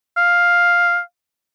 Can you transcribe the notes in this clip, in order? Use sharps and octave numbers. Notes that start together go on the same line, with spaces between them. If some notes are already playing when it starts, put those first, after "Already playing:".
F5